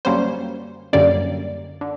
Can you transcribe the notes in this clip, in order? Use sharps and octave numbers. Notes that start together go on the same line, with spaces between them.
F#2 D3 G3 A#3 C#4 C5
F#2 D3 G3 A#3 C#4 D5
D3